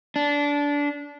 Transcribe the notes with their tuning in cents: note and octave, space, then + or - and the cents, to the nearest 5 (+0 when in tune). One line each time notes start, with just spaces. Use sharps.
D4 -20